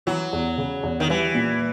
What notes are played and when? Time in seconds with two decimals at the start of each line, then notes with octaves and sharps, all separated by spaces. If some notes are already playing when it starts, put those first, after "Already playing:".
0.07 E3 F#3
0.33 E2
0.58 C#3
0.83 E2
1.00 D#3
1.09 E3 G3
1.34 A#2